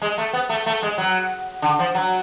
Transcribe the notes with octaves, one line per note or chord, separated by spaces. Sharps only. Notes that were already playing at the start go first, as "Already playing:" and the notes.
G#3
A3
B3
A3
A3
G#3
F#3
D3
F3
F#3